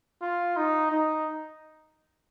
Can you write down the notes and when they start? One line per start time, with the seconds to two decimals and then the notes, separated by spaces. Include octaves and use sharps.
0.22 F4
0.57 D#4
0.92 D#4